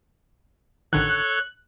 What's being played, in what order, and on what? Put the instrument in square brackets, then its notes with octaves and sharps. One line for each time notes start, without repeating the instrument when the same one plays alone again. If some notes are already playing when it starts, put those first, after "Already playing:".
[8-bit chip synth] A1 D3 D#3 [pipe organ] A4 C#5 C#6 [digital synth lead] F#6